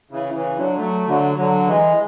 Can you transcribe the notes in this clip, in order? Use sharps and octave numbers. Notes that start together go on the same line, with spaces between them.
C#3 E3
C#3 E3
D3 F#3
F#3 A3
D3 F#3
D3 F#3
E3 G#3